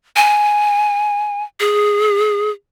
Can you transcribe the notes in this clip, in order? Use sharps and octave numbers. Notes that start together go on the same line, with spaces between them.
G#5
G#4